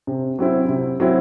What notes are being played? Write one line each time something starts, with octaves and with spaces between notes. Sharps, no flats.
C3
F#3 C4 E4
C3
F#3 C4 E4